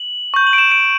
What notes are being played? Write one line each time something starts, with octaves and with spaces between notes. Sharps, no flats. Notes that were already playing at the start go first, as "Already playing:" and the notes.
Already playing: F#7
C#6 G6
F#7
D7
E7
D7